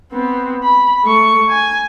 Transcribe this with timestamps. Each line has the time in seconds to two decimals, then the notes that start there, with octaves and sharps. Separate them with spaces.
0.13 B3 C4
0.63 B5
1.04 A3 C#6
1.49 G#5